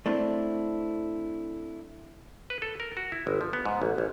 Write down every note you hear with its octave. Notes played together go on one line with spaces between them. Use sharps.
A3 C4 D4 E4
B4
A4
A#4
F#4
E4
G1
F3
B3
G#2
A1
A1